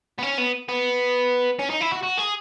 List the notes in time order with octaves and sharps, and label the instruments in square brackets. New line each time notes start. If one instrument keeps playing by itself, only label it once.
[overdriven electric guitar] B3
C#4
B3
B3
C#4
D#4
E4
F#4
F#4
G#4